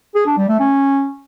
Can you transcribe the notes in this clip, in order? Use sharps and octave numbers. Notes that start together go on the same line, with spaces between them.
G#4
D4
G3
A3
C#4